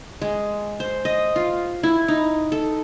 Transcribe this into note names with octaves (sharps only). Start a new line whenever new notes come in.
G#3
C5
D#5
F4
E4
D#4
A4